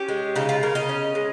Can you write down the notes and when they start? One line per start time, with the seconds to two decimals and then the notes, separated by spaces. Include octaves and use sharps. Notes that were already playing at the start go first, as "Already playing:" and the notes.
Already playing: C#4 G4
0.08 G#3
0.36 C#3 D#4
0.49 F4
0.63 C#3 A#4
0.75 D#5
0.89 C#4
1.15 G#3